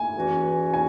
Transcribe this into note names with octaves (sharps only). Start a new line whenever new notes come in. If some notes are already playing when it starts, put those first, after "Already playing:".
Already playing: G#5
E2 E3 C#4 F#4
G#5